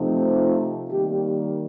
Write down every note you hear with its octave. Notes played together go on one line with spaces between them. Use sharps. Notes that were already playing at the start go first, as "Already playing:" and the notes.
Already playing: C3 F3 A3 C4 D#4
F4
D#3 G3 A#3 G4